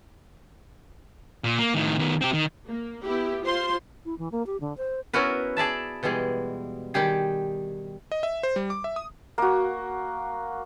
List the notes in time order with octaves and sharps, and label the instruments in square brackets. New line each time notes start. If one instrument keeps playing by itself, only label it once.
[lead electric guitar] A#2
A#3
A2 D#3
D#3 B3
C4 G4
D#3
[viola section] A#3
B3 E4 G4
F4 C5 C6
[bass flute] E4
E3
A#3
G4
D3
C5
[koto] B3 C#4 E4 F#4 A#4 B4
G#4 D5 E5 A5
B2 E3 G3 G#3 G#4
D#3 G3 G4 G#4
[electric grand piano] D#5
E5
C5
G3
D6
E5
D#6
[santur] A#3 F#4